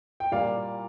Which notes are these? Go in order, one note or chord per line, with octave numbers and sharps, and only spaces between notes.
G5
A#2 G3 A#3 D5 F5